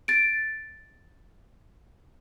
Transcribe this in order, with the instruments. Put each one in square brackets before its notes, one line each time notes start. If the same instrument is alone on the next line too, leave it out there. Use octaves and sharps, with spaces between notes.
[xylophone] A6 D7